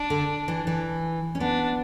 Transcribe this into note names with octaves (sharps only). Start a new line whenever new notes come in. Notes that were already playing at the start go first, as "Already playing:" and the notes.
Already playing: D4
D3
E3
E3
C#4
B3 D4